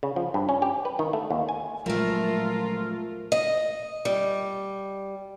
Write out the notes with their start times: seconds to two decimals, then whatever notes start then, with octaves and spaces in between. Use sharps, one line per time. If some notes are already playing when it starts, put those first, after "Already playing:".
0.03 C#3
0.16 F3
0.34 G2
0.49 C#4
0.62 G4
0.85 B4
0.99 D#3
1.13 A3
1.30 D#2
1.49 G#5
1.86 A#2 F3 F#3 G#3 A3 F4 A#4
3.32 D#5
4.05 G3